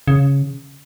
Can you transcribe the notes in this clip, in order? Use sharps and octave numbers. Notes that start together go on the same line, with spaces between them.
C#3